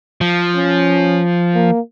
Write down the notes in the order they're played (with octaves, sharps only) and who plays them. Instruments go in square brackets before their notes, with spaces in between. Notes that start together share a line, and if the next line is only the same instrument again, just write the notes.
[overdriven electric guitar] F3
[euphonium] C#4
A#3